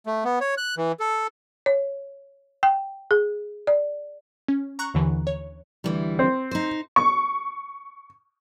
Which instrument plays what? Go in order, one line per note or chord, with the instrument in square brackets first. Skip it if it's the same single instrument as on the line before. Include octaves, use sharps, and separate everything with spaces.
[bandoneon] A3
B3
C#5
F#6
E3
A4
[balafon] C#5
G5
G#4
D5
[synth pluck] C#4
A#5 C#6 F#6
D#2 D3 E3
C#5
[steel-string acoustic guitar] D2 E3 G3
[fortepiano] C4
[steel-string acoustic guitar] D#4 C5
[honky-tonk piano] C#6